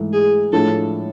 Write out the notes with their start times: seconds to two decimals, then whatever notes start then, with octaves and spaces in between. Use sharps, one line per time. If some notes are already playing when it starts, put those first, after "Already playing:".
Already playing: G#2 E3 A3
0.13 G#4
0.53 A2 F3 A3 D4 A4